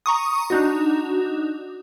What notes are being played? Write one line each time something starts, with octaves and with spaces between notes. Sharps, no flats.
A#5 C#6 D#6
D4 D#4 F#4